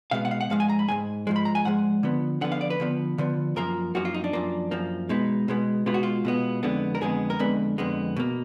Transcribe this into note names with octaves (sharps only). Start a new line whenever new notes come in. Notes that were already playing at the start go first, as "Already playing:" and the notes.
B2 G#3 B3 F5
F#5
F5
F#5
G#2 F3 G#3 F5
G#5
A#5
B5
G#2 F3 G#3 G#5
G#2 F3 G#3
B5
A#5
G#5
G#2 F3 G#3 F#5
D3 F3 B3
D3 F3 B3 F#5
F5
D5
B4
D3 F3 B3
D3 F3 B3
F#2 F3 A#3 A#4
F#2 F3 A#3 F#4
F4
D#4
D4
F#2 F3 A#3
F#2 F3 A#3
B2 G#3 B3 D#4
B2 G#3 B3
B2 G#3 B3 F4
F#4
F4
B2 G#3 B3
F2 D3 G#3 B3
A#4
F2 D3 G#3 B3 G#4
A#4
F2 D3 G#3 B3 B4
F2 D3 G#3 B3
B2 A#3